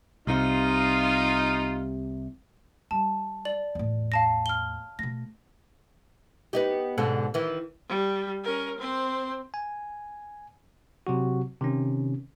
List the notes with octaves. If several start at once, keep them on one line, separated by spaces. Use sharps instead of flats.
C2 C3 D#4 F4
G3 A5
D5 F#7
E2 A2
F5 A5 A#6
F6 G7
B2 A3 A#6
B3 D#4 G4
G#2 B2 D3
D#3 E3
G3
C#4 A#4
C4 C5
G#5
C3 F#3 F#4
C3 D#3 C#4